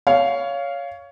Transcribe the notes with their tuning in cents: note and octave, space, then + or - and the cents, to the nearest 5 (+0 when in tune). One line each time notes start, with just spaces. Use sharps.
C#5 +15 F5 -5